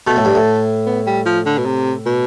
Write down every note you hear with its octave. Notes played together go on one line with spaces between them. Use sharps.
B2 A3
A2
G2
A2
B3
G3
F3
D3
B2
C3
B2